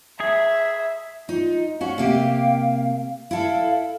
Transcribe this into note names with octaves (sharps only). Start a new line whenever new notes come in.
G#4 E5
D#4 F4
C#4 F#4 F5
C3 A#3 G4
E4 A4 F5